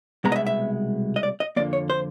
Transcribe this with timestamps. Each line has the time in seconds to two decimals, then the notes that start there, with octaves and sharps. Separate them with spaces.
0.24 C2 B2 G#3 B3 A#5
0.32 D#5
0.36 E5
0.46 E5
1.16 D#5
1.23 D5
1.40 D#5
1.56 F2 D3 F3 A#3 D5
1.73 C#5
1.90 C5